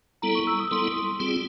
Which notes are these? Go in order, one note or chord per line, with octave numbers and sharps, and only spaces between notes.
G3 B3 E4 A4 A#5
C#6
E6
D#6
G3 B3 E4 A4 C6
G3 C4 F4 G#4